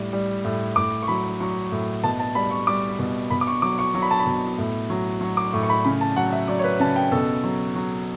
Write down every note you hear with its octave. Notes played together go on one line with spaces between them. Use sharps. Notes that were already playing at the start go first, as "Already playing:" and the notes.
Already playing: A2 G3
G3
A2
A2 D6
C#6
F#3 B5
F#3 C#6
A2
B2 A5
A5
G3 B5
C#6
G3 D6
B2
B2 B5
D6
C#6
F#3 D6
C#6
F#3 C#6
B5
A5
B5
B2
A2
F#3
F#3 C#6
D6
A2 C#6
C#6
B5
C#3 B5
A5
F#3 F#5
E5
F#3 D5
C#5
B4
C#3 A5
G5
B2 A4
F#3
F#3